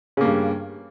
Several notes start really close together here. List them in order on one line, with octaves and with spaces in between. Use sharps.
C#3 A#3 G2